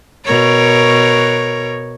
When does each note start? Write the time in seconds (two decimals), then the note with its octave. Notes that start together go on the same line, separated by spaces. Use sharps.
0.25 B2 A#4 C#5